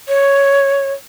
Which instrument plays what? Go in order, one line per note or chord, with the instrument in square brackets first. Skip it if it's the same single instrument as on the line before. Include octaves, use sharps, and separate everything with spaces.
[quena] C#5